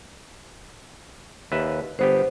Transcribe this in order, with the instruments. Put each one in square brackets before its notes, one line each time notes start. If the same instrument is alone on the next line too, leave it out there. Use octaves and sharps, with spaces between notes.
[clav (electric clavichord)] D#2 B4 E5
[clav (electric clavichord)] G1 B3 G4 [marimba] C5